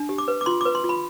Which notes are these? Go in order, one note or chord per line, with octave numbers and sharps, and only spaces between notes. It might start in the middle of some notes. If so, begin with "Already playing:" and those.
Already playing: D4
G4
D6
B4
D6
F4 C6
B4 D6
C6
F4
B5